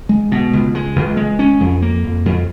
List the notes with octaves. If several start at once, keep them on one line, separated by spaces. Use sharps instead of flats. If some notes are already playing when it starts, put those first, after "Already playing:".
G#3
B2
C#2
G#3
C#2
G#3
C#4
F2
A#3
F2
F2